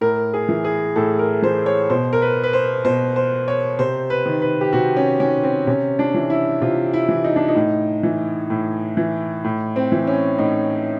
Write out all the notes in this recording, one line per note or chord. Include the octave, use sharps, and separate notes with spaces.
A2 A#4
G#4
E3
G#4
A2 A4
A#4
E3 C5
C#5
B2 C5
A#4
B4
B4
C5
B2 C5
C5
C#5
C3 C5
B4
D#3
B4
G4
C3 F#4
C#4
D#3 C#4
C4
C3 C#4
D4
E3
E4
C3 F4
E4
E3
D#4
D4
D#4
A2
E3
A2
E3
A2
C4
E3
C#4
A2 D#4